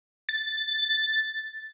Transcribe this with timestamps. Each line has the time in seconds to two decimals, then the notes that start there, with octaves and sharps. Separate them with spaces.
0.29 A6